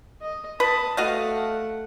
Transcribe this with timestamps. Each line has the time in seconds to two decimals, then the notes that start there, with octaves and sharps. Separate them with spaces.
0.22 D#5
0.60 B4 A5 D#6
0.97 A3 F#4 D#5 F5 F#5